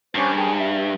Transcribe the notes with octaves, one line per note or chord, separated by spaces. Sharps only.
G2 C#4 D4 C5
G#4 A#4 G5
E5